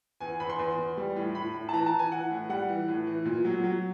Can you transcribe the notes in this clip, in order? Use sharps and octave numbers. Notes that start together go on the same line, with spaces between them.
E2 G#5
E2 B5
C6
E2
E2
G3
A2
A2 B5
A2
A5
E3 A#5
A5
E3
G#5
E3 F#5
A2
G3 F#5
E3
A2
E3
A#2
F#3
F#3